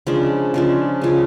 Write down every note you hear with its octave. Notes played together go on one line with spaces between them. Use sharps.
C#3 F3 G#3 D4
C#3 F3 G#3 D4
C#3 F3 G#3